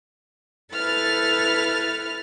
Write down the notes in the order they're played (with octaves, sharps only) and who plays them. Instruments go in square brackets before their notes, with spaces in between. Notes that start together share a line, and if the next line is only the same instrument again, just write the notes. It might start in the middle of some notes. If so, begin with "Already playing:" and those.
[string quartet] E4 A4 B4 F6 A6